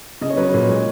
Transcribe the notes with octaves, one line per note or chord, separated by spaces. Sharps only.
C#3 D#5
C#5
F#3 B4
C#5
A#2
G#3